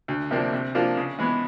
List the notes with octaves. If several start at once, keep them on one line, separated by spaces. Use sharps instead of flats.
D2
C3 F3 A#3 D4
C3
F3 A#3 D4 F4
C#3
E3 G#3 B3